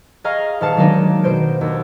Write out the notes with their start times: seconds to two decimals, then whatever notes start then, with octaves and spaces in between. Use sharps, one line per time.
0.24 G#4 D#5 F5 A#5 C#6 F6
0.61 D#1 F5 A5 C#7
0.77 D#3 F#3 G#3 A#3 D4 D#4
1.23 B2 C5 G6 D7
1.61 D#2